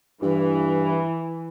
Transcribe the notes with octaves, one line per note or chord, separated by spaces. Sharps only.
G2 E3